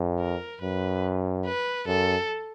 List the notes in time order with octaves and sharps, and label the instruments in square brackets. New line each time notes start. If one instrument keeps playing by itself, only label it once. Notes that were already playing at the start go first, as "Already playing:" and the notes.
Already playing: [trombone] F2
[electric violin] A#4
[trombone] F#2 [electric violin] B4
[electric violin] B4
[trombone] F#2 [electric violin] A4